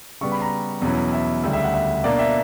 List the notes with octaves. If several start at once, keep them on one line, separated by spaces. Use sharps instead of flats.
C#3 G3 B3 C#6
B5
A#5
E2 B2 F#3 C#4 E4
E5
D2 C#3 G3 E5
E5
F#5
E5
B2 A#3 D4 D5
E5